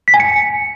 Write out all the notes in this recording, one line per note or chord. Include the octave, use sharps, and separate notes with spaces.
B6
G#5
C#7